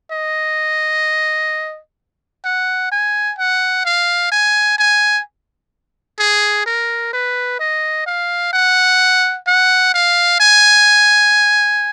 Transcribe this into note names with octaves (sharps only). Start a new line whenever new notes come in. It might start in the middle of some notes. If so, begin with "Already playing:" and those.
D#5
F#5
G#5
F#5
F5
G#5
G#5
G#4
A#4
B4
D#5
F5
F#5
F#5
F5
G#5